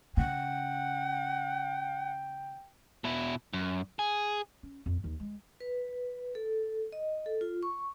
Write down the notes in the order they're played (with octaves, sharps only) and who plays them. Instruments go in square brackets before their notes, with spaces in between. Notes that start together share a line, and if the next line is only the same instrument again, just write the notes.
[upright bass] C#3 [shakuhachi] F#5 [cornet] G5
[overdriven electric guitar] B2 E4
F#2
G#4
[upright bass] C#4
F2
D#2
G#3
[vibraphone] B4
A4
D#5
A4
F4
C#6